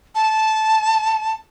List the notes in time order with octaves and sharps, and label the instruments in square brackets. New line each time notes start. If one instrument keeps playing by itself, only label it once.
[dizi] A5